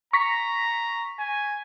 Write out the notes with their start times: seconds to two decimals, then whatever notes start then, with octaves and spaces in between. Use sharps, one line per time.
0.13 A#5 C#6 A#6 B6
1.19 G#5